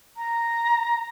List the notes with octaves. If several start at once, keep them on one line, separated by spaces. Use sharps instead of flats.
A#5